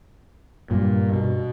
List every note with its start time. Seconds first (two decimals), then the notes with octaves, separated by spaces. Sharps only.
0.71 G2 A#2
1.13 B2